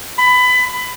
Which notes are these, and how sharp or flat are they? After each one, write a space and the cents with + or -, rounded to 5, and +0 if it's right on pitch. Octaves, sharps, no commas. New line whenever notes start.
B5 +20